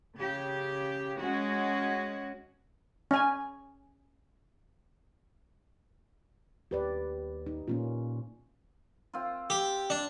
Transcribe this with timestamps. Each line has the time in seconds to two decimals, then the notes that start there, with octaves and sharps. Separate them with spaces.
0.15 C#3 G4
1.19 G#3 C#4 F#4
3.11 C#4 G#5
6.71 D#2 G4 B4 D5
7.46 D#4
7.68 A#2 A#3 C#4 F4
9.13 C4 F4
9.50 G4
9.90 D4